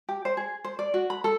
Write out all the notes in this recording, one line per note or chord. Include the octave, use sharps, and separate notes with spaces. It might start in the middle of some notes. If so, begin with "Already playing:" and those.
G4
C5
G#4
C5
D5
F#4
B5
A4